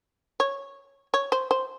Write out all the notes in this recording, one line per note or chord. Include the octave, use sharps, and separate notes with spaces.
C#5
C#5
C5
C5